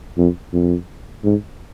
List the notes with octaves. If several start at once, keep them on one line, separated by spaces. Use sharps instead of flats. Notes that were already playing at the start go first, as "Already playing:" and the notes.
F2
F2
G#2